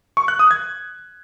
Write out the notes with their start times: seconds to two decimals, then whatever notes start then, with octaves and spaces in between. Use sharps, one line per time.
0.17 C#6
0.28 F#6
0.39 D#6
0.51 G#6